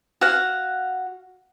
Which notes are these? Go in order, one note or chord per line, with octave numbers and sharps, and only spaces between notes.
F#4 F5 F#5